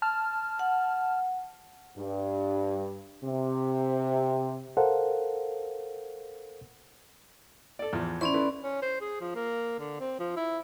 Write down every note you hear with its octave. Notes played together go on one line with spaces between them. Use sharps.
A5 F6
F#5
G2
C3
A4 A#4 C5 F5 F#5
A4 D5
E2 E3 F3
C#4 E4 C5 D5 C6 C#6
E4 A4 B4
C#4
C5
G#4
F3
A#3
D3
C4
F3
E4